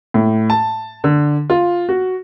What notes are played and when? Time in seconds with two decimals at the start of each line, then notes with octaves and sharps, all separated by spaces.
0.14 A2
0.50 A5
1.04 D3
1.50 F4
1.89 F#4